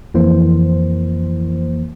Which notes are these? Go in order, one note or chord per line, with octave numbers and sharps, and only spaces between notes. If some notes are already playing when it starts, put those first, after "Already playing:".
F2 E3 A#3 C5